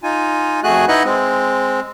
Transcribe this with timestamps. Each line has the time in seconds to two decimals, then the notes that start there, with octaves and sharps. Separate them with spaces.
0.03 D#4 F4 G#5
0.64 F2 A3 F#4 G#4 G#5 F#6
0.88 D#4 E4 B4 D#5 F#5 F#6
1.04 G#3 C4